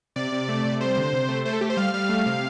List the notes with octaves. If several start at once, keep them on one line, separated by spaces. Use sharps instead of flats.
C3 D5
C3
A3
C3
G3 C5
D3
C3
A3
A3 C5
A4
A3 G4
C5
G3 F5
G3 F5
A3
C3